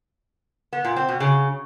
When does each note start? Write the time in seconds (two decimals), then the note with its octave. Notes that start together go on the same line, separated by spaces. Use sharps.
0.73 B3
0.85 A#2
0.96 C4
1.08 B2
1.20 C#3